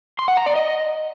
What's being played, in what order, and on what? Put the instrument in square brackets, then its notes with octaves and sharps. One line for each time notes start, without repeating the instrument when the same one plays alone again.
[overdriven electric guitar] C6
F#5
A#5
D5
D#5